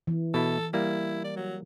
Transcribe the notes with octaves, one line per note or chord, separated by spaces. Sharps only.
E3
B2 E4 A4
G3 A#3 E4
D5
F#3